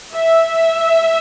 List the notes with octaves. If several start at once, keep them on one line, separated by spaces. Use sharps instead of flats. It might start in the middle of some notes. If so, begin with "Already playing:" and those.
E5